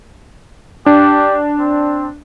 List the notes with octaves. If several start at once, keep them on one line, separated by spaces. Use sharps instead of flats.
D4 G4
C4